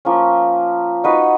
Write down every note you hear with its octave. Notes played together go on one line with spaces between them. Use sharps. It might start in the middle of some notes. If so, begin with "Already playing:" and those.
F3 A#3 C#4
D#4 F#4 B4 D#5